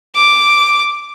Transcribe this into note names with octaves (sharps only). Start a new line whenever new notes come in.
D6